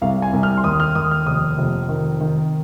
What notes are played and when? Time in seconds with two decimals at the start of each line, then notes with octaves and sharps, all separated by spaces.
0.02 C2 F5
0.22 G#5
0.33 C2
0.43 F6
0.57 C6
0.64 D#2 D#6
0.80 F6
0.95 D#2 D#6
1.11 F6
1.26 F1 D#6
1.58 F1
1.89 D#3
2.21 D#3